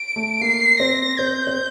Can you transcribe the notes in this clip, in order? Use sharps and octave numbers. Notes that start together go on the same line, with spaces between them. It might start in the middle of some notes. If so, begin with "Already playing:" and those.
Already playing: D7
A3
A#3 C7
C4 A#6
C4 G6
C4